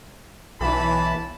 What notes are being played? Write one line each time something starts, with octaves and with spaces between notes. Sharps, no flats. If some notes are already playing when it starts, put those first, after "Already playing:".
B1 E3 A5 B5